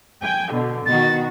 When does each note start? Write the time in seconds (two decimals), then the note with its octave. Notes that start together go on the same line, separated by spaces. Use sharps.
0.22 G5 G#5
0.53 B2 D3
0.86 B2 D#3 F#4 A6